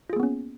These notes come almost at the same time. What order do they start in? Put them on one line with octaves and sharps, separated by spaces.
F4 G#4 A#3 B3 C#4